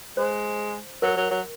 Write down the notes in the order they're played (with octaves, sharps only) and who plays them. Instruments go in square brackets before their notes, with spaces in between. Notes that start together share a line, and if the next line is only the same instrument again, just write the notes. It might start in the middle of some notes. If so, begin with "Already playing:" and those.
[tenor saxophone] G#3 [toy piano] C5
[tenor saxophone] F#3 [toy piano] A#4
[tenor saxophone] F#3
F#3